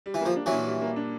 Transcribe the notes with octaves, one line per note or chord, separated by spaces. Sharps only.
G3
E3
F3 A#3
D4
E3 F#3
A#2
G3
A#3
D4